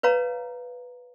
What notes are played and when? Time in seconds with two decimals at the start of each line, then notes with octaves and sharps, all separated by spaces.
0.03 B4 C#5 F5 A#5